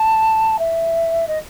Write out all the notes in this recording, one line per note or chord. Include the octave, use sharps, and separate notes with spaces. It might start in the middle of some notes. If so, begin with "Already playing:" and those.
Already playing: A5
E5
D#5